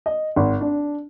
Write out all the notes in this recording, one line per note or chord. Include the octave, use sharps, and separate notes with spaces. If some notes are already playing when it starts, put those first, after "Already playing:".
D#5
G#1
D4